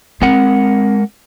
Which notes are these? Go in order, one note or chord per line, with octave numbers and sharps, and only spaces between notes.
G#3 C4 A#4 F#5